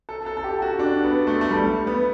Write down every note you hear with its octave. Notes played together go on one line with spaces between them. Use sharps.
A4
A4
A4
G4
F#4
D4
B3
A3
A3
G3
B3